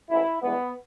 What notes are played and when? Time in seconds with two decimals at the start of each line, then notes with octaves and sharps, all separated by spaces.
0.10 A1 G#2 E3 E4
0.42 G2 E3 G#3 B3